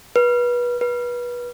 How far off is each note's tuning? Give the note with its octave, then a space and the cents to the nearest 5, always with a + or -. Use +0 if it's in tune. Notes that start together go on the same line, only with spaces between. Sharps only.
B4 -25
B4 -25